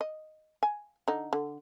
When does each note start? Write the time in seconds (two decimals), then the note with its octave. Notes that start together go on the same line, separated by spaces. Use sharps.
0.01 D#5
0.63 G#5
1.08 D3 D#4
1.33 D3